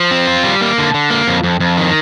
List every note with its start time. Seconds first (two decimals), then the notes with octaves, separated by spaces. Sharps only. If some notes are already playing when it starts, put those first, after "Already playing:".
Already playing: F3
0.11 C4
0.27 F4
0.44 G3
0.61 A#3
0.78 D3
0.94 D3
1.10 A#3
1.27 F2
1.43 F2
1.60 F2
1.77 D#3